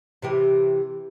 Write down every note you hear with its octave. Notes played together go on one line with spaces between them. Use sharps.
C3 E3 G4